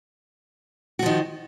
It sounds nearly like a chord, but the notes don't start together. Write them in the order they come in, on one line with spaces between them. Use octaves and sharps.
F#4 F3 D#3